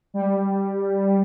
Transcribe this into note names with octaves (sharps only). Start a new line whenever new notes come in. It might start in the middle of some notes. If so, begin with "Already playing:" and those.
G3